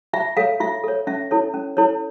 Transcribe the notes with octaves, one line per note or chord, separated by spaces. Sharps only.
F4 E5
A4 C#5 F5
F4 E5
A4 C#5
C#4 E5
E4 A4 C#5
C#4
E4 A4 C#5